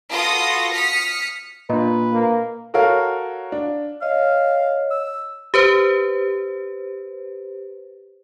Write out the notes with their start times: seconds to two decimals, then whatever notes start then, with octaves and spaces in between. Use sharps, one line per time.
0.11 F4 F#4 A4 B4 D#6 A#6
0.73 D#6 F6 B6 C#7
1.70 A#2 D4 B4 D#5
2.13 A#3
2.74 F#4 A4 A#4 C#5 F5
3.52 D4
4.02 C#5 D#5 F5
4.91 E6
5.54 G4 B4 C5